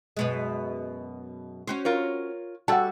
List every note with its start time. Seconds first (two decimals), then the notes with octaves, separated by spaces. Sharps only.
0.17 F#2 B2 G#3
1.67 C#4 F#4 C5
1.85 F4 A#4 C#5
2.68 G3 F#4 A4 F#5 A5